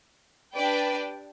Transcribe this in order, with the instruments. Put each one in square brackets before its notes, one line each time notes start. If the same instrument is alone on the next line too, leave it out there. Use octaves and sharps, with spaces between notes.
[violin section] D4 G4 B4 D5 G5